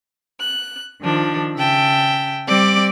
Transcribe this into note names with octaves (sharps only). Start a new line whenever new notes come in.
F#6
D#3 F3 D4
C#3 E5 G5 A5
G3 C4 D5 D6